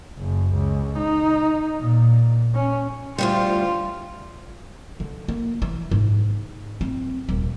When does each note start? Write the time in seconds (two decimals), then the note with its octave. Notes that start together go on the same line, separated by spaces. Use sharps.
0.18 F#1
0.53 C#2
0.98 D#4
1.81 A#2
2.54 C#4
3.18 D2 F3 G3 F4
5.00 D3
5.28 A#3
5.62 E3
5.91 G#2
6.81 C4
7.29 D#1